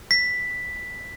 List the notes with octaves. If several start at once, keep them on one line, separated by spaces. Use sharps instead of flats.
B6